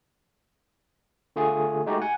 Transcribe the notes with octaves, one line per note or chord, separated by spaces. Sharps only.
D3 A3 F4 G#4
G#3 A3 D#4 F#4 G4
F#5 G#5